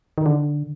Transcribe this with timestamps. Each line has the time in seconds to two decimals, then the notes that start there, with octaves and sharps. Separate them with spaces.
0.18 D#3
0.26 D3